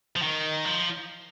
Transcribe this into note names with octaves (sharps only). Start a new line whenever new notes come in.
F3
D#3
F3